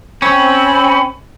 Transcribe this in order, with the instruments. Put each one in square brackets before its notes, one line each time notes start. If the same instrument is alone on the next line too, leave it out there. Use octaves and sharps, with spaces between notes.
[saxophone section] C4 [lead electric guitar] C#4 [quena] B5